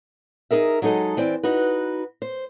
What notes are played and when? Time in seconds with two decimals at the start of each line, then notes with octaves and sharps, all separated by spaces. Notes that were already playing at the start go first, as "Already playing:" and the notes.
0.51 D#4 G#4 A#4 E5
0.82 F#3 G#3 D#4 A4
1.17 E3 C4 D5
1.43 D#4 F#4 B4
2.22 C5